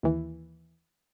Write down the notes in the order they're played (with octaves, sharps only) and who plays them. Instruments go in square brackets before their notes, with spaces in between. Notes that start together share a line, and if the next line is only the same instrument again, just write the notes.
[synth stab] D#2 E3